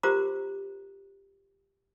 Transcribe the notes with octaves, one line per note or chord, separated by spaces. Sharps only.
F4 G4 A#4 C5 A#5 D6